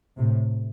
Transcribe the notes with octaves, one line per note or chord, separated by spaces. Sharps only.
A2 C3